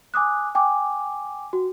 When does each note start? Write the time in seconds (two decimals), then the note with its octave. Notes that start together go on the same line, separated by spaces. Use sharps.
0.14 G#5 D6 D#6 F#6
0.55 G5 G#5 D6
1.53 F#4